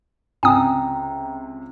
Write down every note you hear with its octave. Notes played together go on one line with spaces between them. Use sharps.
C#2 C3 G5 G#5 A#5 D#6